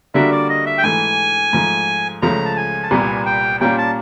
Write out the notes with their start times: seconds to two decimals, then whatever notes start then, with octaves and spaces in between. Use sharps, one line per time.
0.14 D3 G3 A#3 D4 F#4 E5
0.32 D5
0.49 D#5
0.66 E5
0.78 G5
0.83 G#2 E3 A3 G#5
1.53 G#2 F3 A3
2.22 C#2 C#3 F3 A3 A#5
2.45 A5
2.57 G#5
2.83 A5
2.91 C2 A#2 G3 B3 G#5
3.26 G5
3.60 A#2 G3 A#3 C#4 F4 G5
3.78 A5